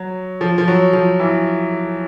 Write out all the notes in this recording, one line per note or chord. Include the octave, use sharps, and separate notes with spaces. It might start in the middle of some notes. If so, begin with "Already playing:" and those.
Already playing: F#3
F3
F3
F#3
F3
E3